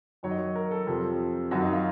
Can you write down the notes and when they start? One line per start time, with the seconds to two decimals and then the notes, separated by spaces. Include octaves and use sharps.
0.23 F#2 D#3 F#3 C#5
0.31 D#5
0.38 C#5
0.55 A#4
0.71 A4
0.87 F2 C3 F3
1.51 F#2 D#3 F#3 F#4
1.62 D#4
1.73 F4